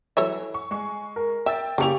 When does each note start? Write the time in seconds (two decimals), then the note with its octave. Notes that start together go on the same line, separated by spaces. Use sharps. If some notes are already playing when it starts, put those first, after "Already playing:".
0.17 E3 F#3 A4 C#5 E5
0.54 C#6
0.71 G#3 C#6
1.16 A#4
1.46 E5 G5 E6 A6
1.78 C#3 A#3 D4 E4 G4 G5 C#6 F7